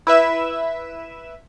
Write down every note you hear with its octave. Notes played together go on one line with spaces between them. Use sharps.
E4 B4 E5 E7